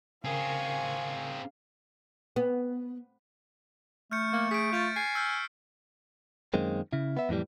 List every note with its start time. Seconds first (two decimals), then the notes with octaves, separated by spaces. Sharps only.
0.25 C#3 C4 G#4 A#4 F5 G#5 C#6
2.36 B3
4.11 A3 F6 G6 C#7
4.33 A#3
4.51 G#4 B6 D7
4.72 F4 C#6 G6 A6
4.96 G#5 C7
5.15 E6 F6 G6
6.54 F#2 D#3 G#3 A#3 C4
6.93 C#3 E4
7.17 B3 E5
7.29 F2 A2 E3 G3